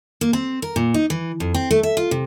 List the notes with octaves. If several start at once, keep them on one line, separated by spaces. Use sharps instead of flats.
A#3
C4
A#4
A#2
D#4
E3
F2
C4
A3
E5
F4
C3